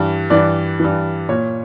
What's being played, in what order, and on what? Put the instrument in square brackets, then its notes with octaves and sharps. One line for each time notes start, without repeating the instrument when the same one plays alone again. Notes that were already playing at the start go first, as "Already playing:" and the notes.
Already playing: [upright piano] G2 E3
G2 E3 D5
G2 E3
A#2 C#5